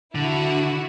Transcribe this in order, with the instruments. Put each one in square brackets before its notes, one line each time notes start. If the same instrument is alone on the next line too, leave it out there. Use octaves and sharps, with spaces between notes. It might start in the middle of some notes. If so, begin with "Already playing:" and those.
[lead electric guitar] D3 [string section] E4 F#4